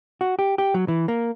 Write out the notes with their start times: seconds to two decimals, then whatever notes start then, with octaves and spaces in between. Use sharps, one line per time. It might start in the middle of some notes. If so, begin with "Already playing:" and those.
0.21 F#4
0.39 G4
0.58 G4
0.74 F#3
0.88 E3
1.08 A#3